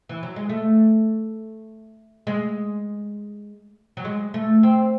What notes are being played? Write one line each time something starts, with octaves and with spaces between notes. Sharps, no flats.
E3
F#3
G#3
A3
G#3
F#3
G#3
A3
C4